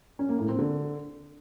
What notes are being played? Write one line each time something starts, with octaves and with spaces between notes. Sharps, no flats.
C#4
A#3
A2
C4
D3